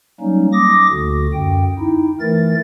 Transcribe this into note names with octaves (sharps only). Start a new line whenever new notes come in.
F#3 G3 A#3 C#4 D#4
D6 D#6 A#6
D2 D3 F#4
F#2 G5
D#4 E4
E3 A3 A#4 A6